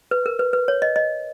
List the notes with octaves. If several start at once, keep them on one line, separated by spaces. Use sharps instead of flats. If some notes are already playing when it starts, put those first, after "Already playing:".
B4
A#4
B4
B4
C#5
D#5
D#5